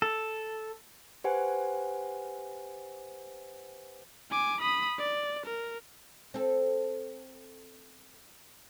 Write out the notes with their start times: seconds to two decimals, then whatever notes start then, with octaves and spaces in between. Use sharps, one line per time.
0.02 A4
1.24 G4 B4 C5 F#5 G#5
4.31 G#5 D6
4.61 B5 D#6
4.98 D5
5.46 A#4
6.34 C4 A4